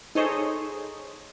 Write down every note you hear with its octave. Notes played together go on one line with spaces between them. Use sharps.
D#4 G#4 A4 C5 C#5 D#5